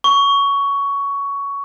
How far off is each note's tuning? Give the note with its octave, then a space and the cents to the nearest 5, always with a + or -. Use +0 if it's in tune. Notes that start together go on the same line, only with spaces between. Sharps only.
C#6 +15